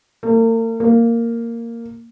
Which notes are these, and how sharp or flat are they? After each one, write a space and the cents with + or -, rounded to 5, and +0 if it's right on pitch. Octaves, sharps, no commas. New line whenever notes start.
A#3 -45
A#3 -10